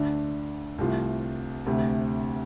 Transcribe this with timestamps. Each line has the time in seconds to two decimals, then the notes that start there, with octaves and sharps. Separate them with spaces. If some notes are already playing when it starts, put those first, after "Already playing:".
Already playing: D2 D3 A3 D4
0.78 C2 C3 A3 F4
1.66 D2 C3 A3